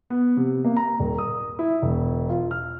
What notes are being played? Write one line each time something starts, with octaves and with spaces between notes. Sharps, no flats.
B3
C3
A#3
A#5
D#1
D#6
E4
E1
F4
F6